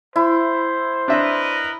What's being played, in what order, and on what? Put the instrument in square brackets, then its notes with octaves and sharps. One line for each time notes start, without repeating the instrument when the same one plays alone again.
[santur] E4 [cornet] C5
[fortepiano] D4 E5 [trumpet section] A#4 B4 D#5